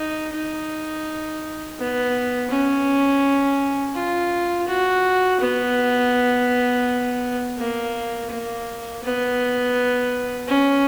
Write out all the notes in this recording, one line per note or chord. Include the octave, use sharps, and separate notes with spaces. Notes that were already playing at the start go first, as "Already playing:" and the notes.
Already playing: D#4
D#4
B3
C#4
F4
F#4
B3
A#3
A#3
B3
C#4